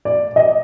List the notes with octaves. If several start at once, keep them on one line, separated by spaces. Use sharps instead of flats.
D5
D#5